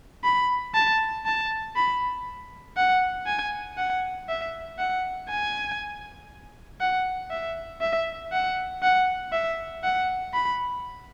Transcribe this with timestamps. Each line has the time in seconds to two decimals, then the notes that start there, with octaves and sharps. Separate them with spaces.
0.24 B5
0.75 A5
1.26 A5
1.76 B5
2.77 F#5
3.27 G#5
3.78 F#5
4.29 E5
4.78 F#5
5.29 G#5
6.81 F#5
7.31 E5
7.81 E5
8.32 F#5
8.83 F#5
9.32 E5
9.83 F#5
10.33 B5